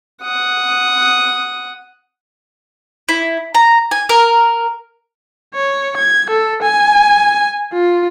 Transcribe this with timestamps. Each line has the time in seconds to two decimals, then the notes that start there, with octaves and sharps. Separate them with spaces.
0.23 F#5 D#6
3.09 E4
3.55 A#5
3.91 G#5
4.09 A#4
5.54 C#5
5.97 G#6
6.30 A4
6.62 G#5
7.73 F4